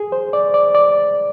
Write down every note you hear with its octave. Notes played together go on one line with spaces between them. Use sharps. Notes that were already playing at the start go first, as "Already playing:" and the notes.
Already playing: G#4
C5
D5
D5
D5